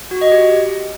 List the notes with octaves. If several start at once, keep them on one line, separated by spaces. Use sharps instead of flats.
F#4
D#5
G4